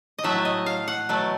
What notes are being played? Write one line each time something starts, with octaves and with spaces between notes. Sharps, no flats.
D#5
A2 F#3 A3 E5
D#5
F5
F#5
B2 F#3 A3